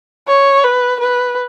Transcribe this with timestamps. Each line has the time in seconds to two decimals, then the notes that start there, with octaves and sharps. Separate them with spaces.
0.28 C#5
0.64 B4
1.00 B4